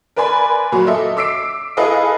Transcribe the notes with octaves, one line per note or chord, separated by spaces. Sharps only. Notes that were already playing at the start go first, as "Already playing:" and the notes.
A#4 B4 D5 G#5 B5 C6
A#2 F#3 F#4
A4 D#5 E5
D6 E6 B6 C7 D7
E4 G#4 A4 B4 D#5 F5